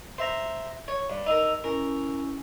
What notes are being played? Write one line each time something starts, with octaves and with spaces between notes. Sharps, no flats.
C5 E5 A#5
C#5
G2
D#4 A#4 E6
C#4 E4 A#4 G#5